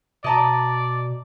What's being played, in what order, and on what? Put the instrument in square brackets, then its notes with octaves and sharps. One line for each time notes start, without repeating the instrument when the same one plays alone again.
[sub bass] B2 [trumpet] D5 [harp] D#5 A5 A#5